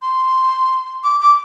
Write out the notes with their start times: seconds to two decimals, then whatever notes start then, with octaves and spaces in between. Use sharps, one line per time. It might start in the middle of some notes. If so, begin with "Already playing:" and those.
0.02 C6
1.04 D6
1.21 D6